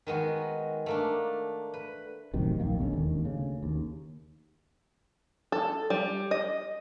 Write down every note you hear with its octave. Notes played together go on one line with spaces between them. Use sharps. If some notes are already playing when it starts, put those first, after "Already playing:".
D#3 G#3 B3 F#4
A3 A#3 D4
B4
A1 F#2 C3 D#3
D1 A#1 D#3 A#3
B2 D3 G#3 C#4
E1 D#2 D#3
D2 C#3
D#2
A4
G3
D#5